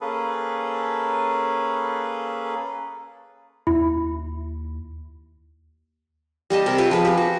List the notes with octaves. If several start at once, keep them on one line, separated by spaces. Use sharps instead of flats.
A#3 C#4 G#4 A4 B4
D#2 E4
G3 G4 D#5 A5
C3 A#4
F4 G4 B4
F3 G#4 B4
G4
F#4